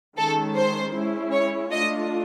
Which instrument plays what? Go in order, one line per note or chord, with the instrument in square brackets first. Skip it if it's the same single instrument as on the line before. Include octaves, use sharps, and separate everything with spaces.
[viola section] D#3 G#3 C#4 [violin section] A4
[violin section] C5
[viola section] G#3 C#4 E4
[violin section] C#5
[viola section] A3 D4 F4 [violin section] D#5